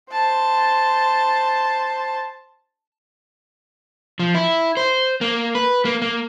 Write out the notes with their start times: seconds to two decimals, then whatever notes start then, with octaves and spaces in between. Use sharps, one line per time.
0.12 C5 A5
4.19 F3
4.35 E4
4.77 C5
5.21 A#3
5.55 B4
5.85 A#3
6.02 A#3